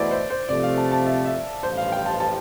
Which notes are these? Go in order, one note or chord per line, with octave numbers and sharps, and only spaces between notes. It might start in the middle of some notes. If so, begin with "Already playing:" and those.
Already playing: E2 B2 A3 E4 C5 D5
C5
C5
C3 F3 A3 D5
F5
A5
A5
E5
E5
A1 G2 F3 C5
F5
G5
A5
A5